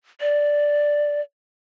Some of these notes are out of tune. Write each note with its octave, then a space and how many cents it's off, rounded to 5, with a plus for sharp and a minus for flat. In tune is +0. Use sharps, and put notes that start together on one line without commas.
D5 +0